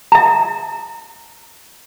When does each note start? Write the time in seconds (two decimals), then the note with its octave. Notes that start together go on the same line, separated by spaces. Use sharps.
0.12 E5 A#5